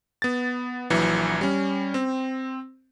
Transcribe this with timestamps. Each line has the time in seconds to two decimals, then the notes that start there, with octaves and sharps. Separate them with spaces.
0.22 B3 A6
0.90 A#1 E3 F#3
1.41 G3 C#4
1.94 C4